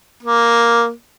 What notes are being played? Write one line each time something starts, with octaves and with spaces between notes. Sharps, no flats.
A#3